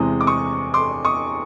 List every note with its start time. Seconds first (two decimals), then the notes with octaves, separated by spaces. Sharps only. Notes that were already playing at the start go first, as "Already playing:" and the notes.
Already playing: E2 C3 E3 G#3 C4 D#6
0.21 D6
0.27 C#6 D#6
0.74 C6 D6
1.05 C#6 D#6